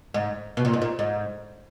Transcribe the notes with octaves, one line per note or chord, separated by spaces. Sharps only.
G#2
B2
A#2
G#2
A#2
G#2